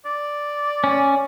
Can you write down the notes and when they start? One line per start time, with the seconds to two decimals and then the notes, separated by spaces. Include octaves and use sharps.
0.06 D5
0.84 C#4